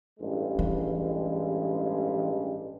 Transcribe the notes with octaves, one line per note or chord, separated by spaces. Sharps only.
A1 G2 G#3
E3